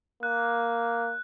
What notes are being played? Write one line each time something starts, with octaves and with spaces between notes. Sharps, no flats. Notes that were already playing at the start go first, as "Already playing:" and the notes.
A#3 F#6